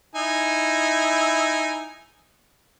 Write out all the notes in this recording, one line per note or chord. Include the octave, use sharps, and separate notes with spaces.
D#4 E4 G#5